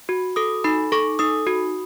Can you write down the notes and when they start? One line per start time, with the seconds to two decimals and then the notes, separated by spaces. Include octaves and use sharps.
0.09 F#4
0.36 A4 D#6
0.64 D#4 B5
0.92 A4 C#6
1.19 D#4 D#6
1.47 F#4